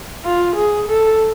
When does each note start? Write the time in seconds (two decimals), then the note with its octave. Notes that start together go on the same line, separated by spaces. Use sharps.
0.25 F4
0.56 G#4
0.88 A4